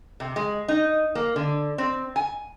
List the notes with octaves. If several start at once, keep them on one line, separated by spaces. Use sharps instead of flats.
C3
G#3
D#4
A#3
D3
C4
G#5